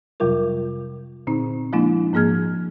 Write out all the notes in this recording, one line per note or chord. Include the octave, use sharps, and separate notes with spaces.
F2 C3 F#3 G3 F4 A#4
A#2 D3 C4 D#4
F3 G#3 A#3 D4 E4
G#2 F3 A#3 G#4 F6 G#6